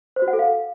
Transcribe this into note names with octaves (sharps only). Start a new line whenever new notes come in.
C5
F#4
F#5
A4
F5